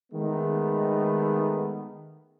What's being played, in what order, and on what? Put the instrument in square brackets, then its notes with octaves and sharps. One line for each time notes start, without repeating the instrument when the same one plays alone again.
[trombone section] D#3 G#3 A3 B3 D#4